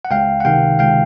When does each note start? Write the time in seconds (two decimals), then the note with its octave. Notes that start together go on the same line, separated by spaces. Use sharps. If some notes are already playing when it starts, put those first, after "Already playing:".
0.05 F#5
0.11 C#2 F5 G5
0.40 F#5
0.45 C3 D#3 F5 G5
0.79 C#2 F5 G5